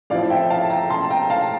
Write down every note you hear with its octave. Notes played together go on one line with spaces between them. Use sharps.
A1 A2 F3 C4 E4 D5 F5
E5 G5
F5 A5
G5 A#5
A5 C6
G5 A#5
F5 A5